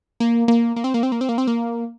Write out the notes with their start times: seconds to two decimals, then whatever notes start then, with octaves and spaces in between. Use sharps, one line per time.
0.20 A#3
0.48 A#3
0.76 A#3
0.84 C4
0.94 A#3
1.03 C4
1.12 A#3
1.21 C4
1.29 A#3
1.38 C4
1.47 A#3